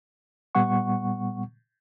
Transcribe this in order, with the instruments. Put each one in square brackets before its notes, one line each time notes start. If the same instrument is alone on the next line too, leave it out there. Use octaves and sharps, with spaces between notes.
[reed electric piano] A#2 G3 B3 F#5 C#6